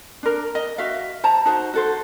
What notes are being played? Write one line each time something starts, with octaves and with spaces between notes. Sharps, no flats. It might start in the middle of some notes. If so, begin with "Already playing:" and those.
D4 A#4
D#5
F#4 E5 F5
C5 A5 A#5
D#4 F#4 C5
F#4 A4 C5